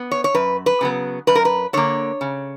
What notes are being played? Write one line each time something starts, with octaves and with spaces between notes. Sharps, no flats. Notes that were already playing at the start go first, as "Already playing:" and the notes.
Already playing: B3
C#5
C#5
F#2 B4
B4
C#3 F#3 B3
F#2 B4
A#4
B4
D3 A#3 C#5
C#3